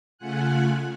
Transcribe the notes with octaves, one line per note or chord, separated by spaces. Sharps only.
C#3 A3 F4 F#5 G#5 F#6